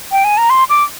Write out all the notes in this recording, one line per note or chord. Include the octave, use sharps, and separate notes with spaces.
G5
G#5
A#5
C6
D6